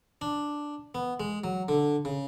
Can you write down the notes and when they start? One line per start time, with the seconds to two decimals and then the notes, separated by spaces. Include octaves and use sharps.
0.21 D4
0.95 B3
1.20 G#3
1.44 F#3
1.68 D3
2.05 C#3